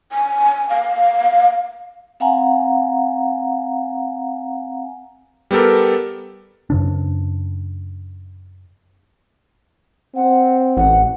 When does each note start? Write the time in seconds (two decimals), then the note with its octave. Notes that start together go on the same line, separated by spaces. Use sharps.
0.12 G#5
0.69 F5
2.20 C4 F5 F#5 G#5 A#5
5.51 G3 B3 G4 A4 A#4
6.70 F#2 C#3 D4
10.15 C4 F#5
10.77 A1 F#5